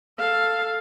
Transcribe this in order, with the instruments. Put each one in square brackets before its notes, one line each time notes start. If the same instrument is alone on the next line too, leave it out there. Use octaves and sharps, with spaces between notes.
[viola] A4 F5